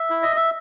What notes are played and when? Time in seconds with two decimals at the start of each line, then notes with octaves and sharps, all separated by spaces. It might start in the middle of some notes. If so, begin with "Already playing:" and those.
Already playing: E5
0.10 E4
0.23 D#5
0.36 E5